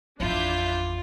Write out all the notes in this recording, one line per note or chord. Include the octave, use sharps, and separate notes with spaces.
A1 F2 D4 E4 F4 G6